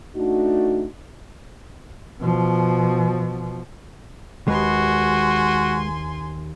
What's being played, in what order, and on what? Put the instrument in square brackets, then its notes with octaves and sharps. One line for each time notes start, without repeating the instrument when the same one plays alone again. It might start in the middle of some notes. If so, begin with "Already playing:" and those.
[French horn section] A3 D4 D#4 F#4
[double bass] B2 F3
[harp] D#2 [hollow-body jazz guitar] G#3 B4 [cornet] F#4 [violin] G#5 C6